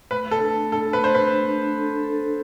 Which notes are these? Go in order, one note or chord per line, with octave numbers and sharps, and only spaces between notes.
A3 B4
A4
D4
A3
A4
A3 B4
C5
B4
D4
D4
A4
A4